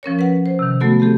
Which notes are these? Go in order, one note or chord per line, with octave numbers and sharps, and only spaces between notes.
F3 C#4 A#4 C#5
B4 F#5
C5
C3 D#3
F#3 A3 B3 F#4 A4
A3 C4 G4 A4